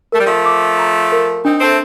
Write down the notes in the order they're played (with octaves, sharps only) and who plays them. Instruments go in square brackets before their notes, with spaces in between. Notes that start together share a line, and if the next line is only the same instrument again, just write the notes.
[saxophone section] A3 [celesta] A#4
[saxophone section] G3
F3 A3
[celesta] D6
A#5
A#4
[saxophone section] C4 D#4 [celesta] D4
[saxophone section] A3 C4